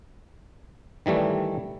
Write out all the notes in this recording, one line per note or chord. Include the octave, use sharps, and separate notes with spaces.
D#3 E3 G3 A3